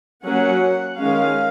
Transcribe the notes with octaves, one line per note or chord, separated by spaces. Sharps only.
F#3 A#3 C#4 F#5
D#3 G#3 C#4 F5